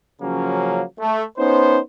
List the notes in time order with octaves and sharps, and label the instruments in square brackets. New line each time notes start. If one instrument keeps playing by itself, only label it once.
[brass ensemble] C#3 F3 F#3 A#3 C#4
A3
B3 C#4 D#4 C5